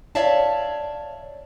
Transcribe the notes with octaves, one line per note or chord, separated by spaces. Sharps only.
C#5 D5 E5 F5 A5